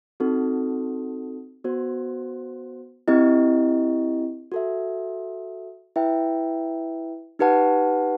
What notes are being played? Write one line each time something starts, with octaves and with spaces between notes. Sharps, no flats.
C4 D#4 F#4 A4
B3 F#4 C5
C4 E4 G4 D#5
F#4 A4 E5
E4 B4 E5 G5
D#4 G4 B4 F#5 A5